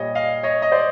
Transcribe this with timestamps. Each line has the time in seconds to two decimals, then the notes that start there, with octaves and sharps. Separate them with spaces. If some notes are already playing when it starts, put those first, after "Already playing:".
Already playing: A#2 G3 C#5 D#5
0.15 D#5 F5
0.43 C#5 D#5
0.62 D#5
0.72 C5 D5